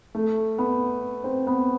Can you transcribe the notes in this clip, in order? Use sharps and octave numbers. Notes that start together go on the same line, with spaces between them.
A3
B3
C4
B3